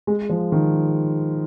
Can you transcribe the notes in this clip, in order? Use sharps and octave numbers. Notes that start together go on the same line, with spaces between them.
G#3
F3
D#3